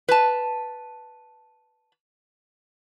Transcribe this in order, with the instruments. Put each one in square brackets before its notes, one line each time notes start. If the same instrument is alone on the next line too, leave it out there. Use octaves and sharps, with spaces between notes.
[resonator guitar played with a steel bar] B4 A5